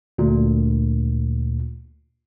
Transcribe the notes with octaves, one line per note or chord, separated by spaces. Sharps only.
D2 A#2